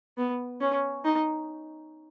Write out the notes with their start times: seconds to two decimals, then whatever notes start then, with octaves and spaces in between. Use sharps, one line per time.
0.18 B3
0.61 C#4
1.04 D#4